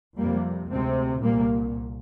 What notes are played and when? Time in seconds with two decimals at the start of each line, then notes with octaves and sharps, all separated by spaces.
0.17 F2 C3 G3 A#3
0.70 D2 C3 G#3 C4
1.22 C2 A#2 G3 A#3